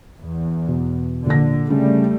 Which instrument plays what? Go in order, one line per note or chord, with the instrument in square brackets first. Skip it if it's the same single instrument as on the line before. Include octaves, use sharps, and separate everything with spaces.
[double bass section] E2
[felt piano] B2
[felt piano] A#1 A#6 [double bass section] D3
[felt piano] C#3 [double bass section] G3 A3